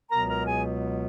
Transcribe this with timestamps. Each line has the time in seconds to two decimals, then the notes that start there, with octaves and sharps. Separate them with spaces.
0.11 C#2 B2 F#3 B3 A#4 A#5
0.29 A#4 A#5
0.47 G#4 G#5